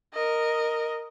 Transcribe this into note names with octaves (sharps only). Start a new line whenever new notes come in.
A#4 D#5